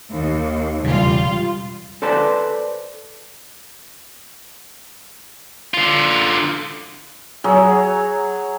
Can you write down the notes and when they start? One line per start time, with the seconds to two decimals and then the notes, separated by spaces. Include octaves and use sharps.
0.11 D#2
0.84 E1 C#3 G3 F4
2.02 A4 B4 C5 D5 A5
5.74 D3 F4
7.44 F#3 G#4 C#5